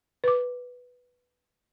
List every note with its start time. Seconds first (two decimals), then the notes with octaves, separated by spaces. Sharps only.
0.24 B4 D6